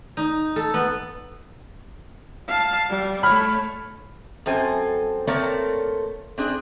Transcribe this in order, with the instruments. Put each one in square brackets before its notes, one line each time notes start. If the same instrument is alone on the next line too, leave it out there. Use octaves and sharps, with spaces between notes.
[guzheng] D#4
A4
B3
[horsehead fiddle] F5 A5
G3
[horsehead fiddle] A3 C#5 [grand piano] B5 F6
[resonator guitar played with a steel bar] F#2 C4 A4 C5 G#5
A3 A#3 C4 A#4 C#5 D5
C4 D4 G#4